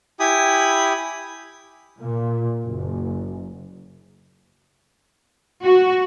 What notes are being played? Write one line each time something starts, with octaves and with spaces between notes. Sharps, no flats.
E4 G4 G#5 B5 D#6
A#2
F#1
F#4